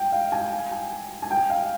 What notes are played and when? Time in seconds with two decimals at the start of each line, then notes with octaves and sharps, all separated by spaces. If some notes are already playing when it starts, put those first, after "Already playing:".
Already playing: G5
0.12 F5
0.32 G#5
0.71 G#5
1.22 G#5
1.31 G5
1.50 F5